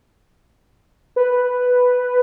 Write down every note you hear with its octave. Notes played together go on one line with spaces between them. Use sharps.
B4